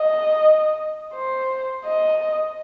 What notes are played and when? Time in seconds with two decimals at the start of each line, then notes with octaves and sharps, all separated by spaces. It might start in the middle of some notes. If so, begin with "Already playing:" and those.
Already playing: D#5
1.14 C5
1.85 D#5